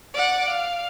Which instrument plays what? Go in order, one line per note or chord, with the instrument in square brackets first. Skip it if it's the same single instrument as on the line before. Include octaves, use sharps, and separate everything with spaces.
[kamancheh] D5 F#5
F5